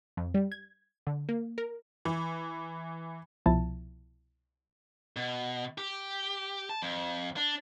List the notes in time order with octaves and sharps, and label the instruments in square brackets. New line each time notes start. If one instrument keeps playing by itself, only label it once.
[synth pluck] F2
G3
G#6
D3
A#3
A#4
[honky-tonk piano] E3
[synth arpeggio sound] C2 B2 F3 E4 A5
[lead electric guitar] B2
G4
A5
F2
D4